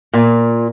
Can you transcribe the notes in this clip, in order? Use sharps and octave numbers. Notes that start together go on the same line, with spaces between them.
A#2